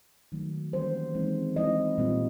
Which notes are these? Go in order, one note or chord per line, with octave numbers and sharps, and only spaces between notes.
D#3 F#3 A3
E3 G3 A#3 C#4 C5
E3 G#3 C4 D#4
F3 G#3 C4 E4 D#5
A#2 G3 C4 F4